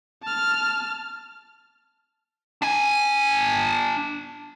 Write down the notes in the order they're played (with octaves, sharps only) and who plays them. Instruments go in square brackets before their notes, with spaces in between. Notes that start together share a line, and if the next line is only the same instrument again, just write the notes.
[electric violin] A5 F6
[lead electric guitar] D4 G#5